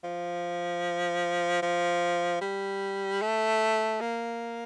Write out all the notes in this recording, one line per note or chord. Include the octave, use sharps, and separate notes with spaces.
F3
F3
G3
A3
A#3